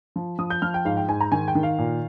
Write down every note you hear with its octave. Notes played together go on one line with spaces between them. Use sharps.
F3
F3 D#6
G6
F3 F6
G5
G#2 F5
G5
G#2 G#5
A#5
D#3 G#5
G5
D#3
F5
A#2